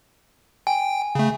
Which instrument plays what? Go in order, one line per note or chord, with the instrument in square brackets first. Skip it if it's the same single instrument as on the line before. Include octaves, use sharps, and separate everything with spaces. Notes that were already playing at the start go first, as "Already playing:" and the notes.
[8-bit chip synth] G5 [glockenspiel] G#5
[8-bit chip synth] C#3 A3